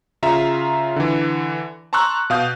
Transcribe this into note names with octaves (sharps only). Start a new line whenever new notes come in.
C#3 F4 E5 A#5
D3 E3
A5 A#5 C6 C#6 E6 F#6
B2 F5 D#6 G6